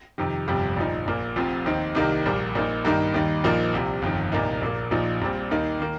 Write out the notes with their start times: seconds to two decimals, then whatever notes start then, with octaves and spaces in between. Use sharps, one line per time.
0.18 F2 C3 D#3
0.48 G1 F2 C3 G3
0.76 A#1 A#2 F3 D#4
1.06 A#1 A#2 A#3
1.36 F1 F2 F3 C4
1.66 D#2 D#3 C4 D#4
1.95 C2 C3 D#3 A#3 D#4
2.26 A#1 A#2 G3 A#3
2.55 A#1 A#2 A#3 D#4
2.85 G2 D#3 A#3 D#4
3.14 D#2 D#3 G3 D#4
3.44 A#1 A#2 F3 A#3 D#4
3.74 C2 C3 F3
4.02 G1 F2 D#3
4.32 C2 A#2 A#3 D#4
4.61 A#1 A#2 A#3
4.91 A#1 A#2 F3 D#4
5.21 A#1 A#2 G3 C4
5.51 D#2 D#3 A#3 D#4
5.80 D#3 A#3